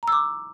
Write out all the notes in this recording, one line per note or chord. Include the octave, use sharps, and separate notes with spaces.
A#5 D6 E6